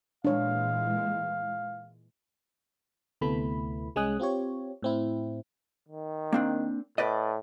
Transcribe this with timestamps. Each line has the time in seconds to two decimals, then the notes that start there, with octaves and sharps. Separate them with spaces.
0.25 A#2 E3 G#3 D4 C#5 F5
3.21 D2 C3 A3 B3 E4 B5
3.96 C2 G#3 C#4 G#5 D#6 F#6
4.19 C4 F4 G4 C#5
4.82 A2 C4 E4
5.89 D#3
6.33 A#3 C4 D4
6.98 A2 B4 D5 D#5